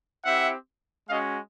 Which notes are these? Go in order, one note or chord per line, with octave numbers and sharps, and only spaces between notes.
C4 E4 G4 E5 F#5
G#3 C#4 F#4 D#5 F5